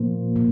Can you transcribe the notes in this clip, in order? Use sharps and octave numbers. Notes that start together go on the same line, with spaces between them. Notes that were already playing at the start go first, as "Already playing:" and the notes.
Already playing: A#2 F3 A#3
A#2